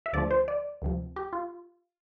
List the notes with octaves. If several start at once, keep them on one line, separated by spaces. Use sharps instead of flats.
E5
D2 D3 F3 A3 D5
C5
D5
D2 C3 F3
G4
F4